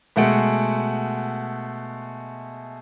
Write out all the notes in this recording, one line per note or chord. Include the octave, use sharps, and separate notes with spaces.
B2 G#3 A3 F#5 D7